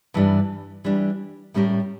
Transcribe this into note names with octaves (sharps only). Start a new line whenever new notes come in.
G2 E3 G3 D4
E3 G3 D4 G4
A2 G3 C#4 G4 A#4